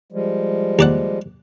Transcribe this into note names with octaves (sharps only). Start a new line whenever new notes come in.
F3 G3 G#3
D#2 D5 F#5